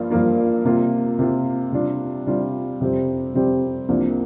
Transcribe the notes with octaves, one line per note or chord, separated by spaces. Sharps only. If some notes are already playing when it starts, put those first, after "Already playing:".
Already playing: G2 F3 A#3 F4
G2 F3 A#3 F4
C3 A#3 F4
C3 A#3 F4
C3 G3 D4 F4
C3 G3 D4 F4
F2 C3 G3 C4 G4
F2 C3 G3 C4 G4
C2 C3 F3 A#3 D4